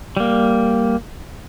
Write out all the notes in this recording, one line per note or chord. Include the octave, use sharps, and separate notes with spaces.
G3 A#3